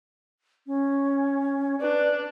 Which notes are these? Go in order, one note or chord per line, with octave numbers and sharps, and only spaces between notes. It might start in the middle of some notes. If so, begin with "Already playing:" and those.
C#4
D4 B4